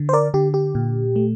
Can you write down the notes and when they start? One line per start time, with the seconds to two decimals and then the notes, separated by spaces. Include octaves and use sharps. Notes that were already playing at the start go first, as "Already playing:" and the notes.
Already playing: D3
0.09 C5
0.13 A#4 D5
0.34 D3 G4
0.54 G4
0.75 A#2
1.16 A3